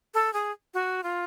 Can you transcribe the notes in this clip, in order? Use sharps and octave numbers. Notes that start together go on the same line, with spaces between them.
A4
G#4
F#4
F4